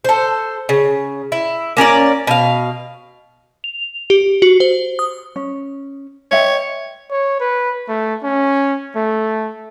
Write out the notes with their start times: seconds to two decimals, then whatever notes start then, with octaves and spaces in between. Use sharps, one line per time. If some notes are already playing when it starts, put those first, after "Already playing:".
0.05 A4 C5
0.69 C#3
1.32 E4
1.77 A#3 C#4 A#4 D5
2.27 B2 A4 F5
3.64 F7
4.10 G4
4.42 F#4
4.60 C5
4.99 D#6
5.36 C#4
6.32 C#5 D#5 E5 G5
7.11 C#5
7.40 B4
7.88 A3
8.23 C#4
8.96 A3